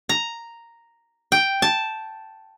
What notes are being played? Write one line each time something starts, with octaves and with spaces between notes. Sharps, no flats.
A#5
G5
A5